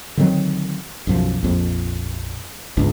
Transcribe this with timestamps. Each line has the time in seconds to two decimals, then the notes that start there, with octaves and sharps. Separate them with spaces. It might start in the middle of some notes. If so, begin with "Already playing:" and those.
0.17 D3 D#3 F#3 C4
1.07 B1 F#2 F3
1.43 A#1 F2
2.77 G1 C#2 G#2 D4